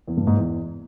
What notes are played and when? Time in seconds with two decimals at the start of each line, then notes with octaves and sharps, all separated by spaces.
0.08 E2
0.17 G2
0.27 G#2
0.37 E2